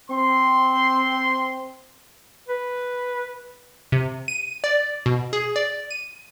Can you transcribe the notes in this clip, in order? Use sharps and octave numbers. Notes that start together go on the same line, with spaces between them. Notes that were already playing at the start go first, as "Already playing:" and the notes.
C4 C6
B4
C3
D#7
D5
B2
G#4
D5
D#7